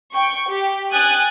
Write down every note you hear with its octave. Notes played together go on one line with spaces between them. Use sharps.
G5 C#6
G4
G5 G#5 D#6 F#6 A6